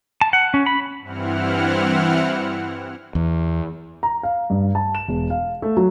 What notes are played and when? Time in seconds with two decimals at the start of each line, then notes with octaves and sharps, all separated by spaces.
0.21 A5
0.33 F#5
0.54 C#4
0.66 B5
1.01 G2 E3 C4 E4 F#5 F6
3.15 E2
4.03 A#5
4.23 F5
4.50 G2
4.75 A5
4.95 E7
5.08 E1
5.30 F5
5.62 A3
5.77 F#3